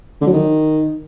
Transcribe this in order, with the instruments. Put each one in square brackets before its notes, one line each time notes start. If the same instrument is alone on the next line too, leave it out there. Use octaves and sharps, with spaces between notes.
[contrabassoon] D3
F#3
D#3